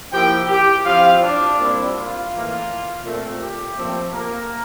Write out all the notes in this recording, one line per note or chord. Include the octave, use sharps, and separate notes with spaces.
F3 A#3 E4 G4 G5
G4 G5
F3 C4 E4 F4 F5
D4 D5
A#2 G3 C4 E4
F4
A2 E3 A#3
A#2 A3 C4
G4
A#2 F3 A3 C4
A#3 A#4